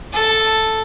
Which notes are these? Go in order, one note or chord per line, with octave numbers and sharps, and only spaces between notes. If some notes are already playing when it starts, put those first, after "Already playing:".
A4